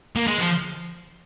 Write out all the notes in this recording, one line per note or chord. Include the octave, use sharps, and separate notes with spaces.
A#3
G#3
F3